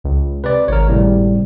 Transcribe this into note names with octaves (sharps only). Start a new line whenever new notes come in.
C#2
C3 B4 D5
G#1 A#4 C#5
A2 C3 G3